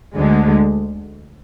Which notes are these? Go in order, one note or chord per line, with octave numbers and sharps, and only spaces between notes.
D2 D3 G#3